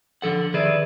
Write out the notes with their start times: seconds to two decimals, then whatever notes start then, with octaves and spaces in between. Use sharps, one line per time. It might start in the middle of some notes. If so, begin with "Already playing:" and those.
0.22 D3 F3 A4 F#5
0.54 D#3 G#4 B4 D5 E5